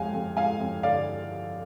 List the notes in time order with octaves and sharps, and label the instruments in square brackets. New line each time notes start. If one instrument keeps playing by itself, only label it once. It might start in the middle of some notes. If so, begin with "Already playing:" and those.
Already playing: [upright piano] F2 G#3 F5 G#5
F2
G#3 F5 G#5
F2
D3 D5 F5